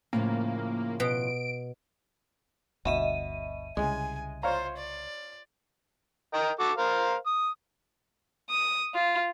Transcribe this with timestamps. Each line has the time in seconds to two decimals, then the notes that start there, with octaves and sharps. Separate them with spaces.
0.13 A2 C#3 F3 A#3
1.00 B2 D7
2.85 G1 D2 B2 D#5 E5 D#7
3.77 C2 C#3 G#3 G#5
4.43 F4 C5 C#5 F5 A#5
4.77 D5
6.34 A#4 D#5 G5
6.60 F#4 A4 D6
6.78 A#4 C5 F5
7.26 D#6
8.50 D#6
8.94 F4